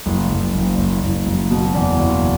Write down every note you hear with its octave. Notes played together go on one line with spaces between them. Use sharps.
F#1
F#1
F#1
F#1
F#1
F#1
B2
E2
F#1